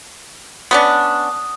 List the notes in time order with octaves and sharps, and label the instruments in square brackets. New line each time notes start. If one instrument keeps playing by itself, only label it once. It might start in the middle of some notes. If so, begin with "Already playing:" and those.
[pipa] B3 C#4 D4 [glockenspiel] D#6